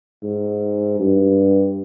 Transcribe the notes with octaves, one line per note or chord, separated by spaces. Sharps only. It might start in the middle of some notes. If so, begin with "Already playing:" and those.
G#2
G2